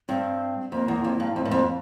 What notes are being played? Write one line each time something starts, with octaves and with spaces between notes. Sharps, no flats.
G2 C4
F2 A#3
E2
F2
G2
F2 A3
G2
F2 A#3